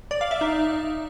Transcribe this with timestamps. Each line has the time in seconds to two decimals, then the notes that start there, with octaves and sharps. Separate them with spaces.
0.11 D5
0.21 F5
0.31 E5
0.41 D#4